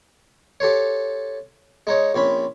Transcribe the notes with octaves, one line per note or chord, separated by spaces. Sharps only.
G4 A4 C5 C#5
G#3 D#4 C#5
A#1 C4 C#4 B5